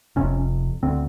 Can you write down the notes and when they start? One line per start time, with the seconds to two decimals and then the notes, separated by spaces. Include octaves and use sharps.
0.16 F1 F2 C3 C#4
0.83 D2 D3 C4